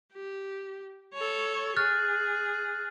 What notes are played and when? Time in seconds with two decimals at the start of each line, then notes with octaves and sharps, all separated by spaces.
0.13 G4
1.14 A4 C#5
1.77 G#4 F6 F#6 A6